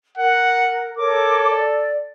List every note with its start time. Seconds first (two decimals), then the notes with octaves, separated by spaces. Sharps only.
0.18 A#4 F#5
0.97 A4 A#4 C#5 D6
1.49 D5